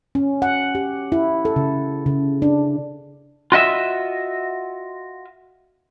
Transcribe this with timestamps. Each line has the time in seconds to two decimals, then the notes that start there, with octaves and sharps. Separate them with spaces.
0.15 C#4
0.42 F#5
0.75 G4
1.12 E4
1.45 A4
1.56 C#3
2.06 C#3
2.42 D4
3.52 F4 F#4 D#5 E5